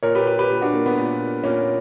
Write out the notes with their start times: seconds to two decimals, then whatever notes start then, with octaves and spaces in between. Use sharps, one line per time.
0.03 A#2 A#4 C#5
0.15 G4 B4
0.27 G4 B4
0.39 G4 B4
0.50 A#2
0.61 D4 F#4
0.73 A#3
0.86 B3
0.97 A#2
1.44 A#2 A#3 C#4